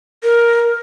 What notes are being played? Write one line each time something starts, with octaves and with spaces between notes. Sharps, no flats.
A#4